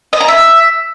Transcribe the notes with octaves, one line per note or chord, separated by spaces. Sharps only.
D#5
A#5
E5